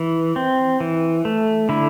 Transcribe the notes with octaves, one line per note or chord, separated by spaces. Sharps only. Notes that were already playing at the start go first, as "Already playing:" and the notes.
Already playing: E3
C4
E3
A3
D3 E4